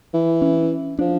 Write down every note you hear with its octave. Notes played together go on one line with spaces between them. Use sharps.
E3
C#4
F3 D4